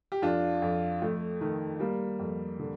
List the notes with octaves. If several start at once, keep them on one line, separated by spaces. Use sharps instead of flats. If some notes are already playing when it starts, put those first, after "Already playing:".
G4
F2 D4 F4
F2
F2 A3
D#3 A3
G3 A#3
F2
D3